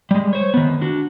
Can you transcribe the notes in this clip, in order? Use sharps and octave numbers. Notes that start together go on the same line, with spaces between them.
G3 G#3
C5 C#5
D#3 B3
D4 F#4